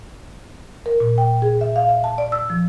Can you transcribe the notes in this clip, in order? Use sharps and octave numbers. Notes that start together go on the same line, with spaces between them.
A#4
A#2
G5
G#4
E5
F5
E5
A5
D5
E6
F3